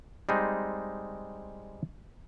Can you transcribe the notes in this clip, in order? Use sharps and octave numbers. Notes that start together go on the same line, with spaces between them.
G3 G#3 C4 D#4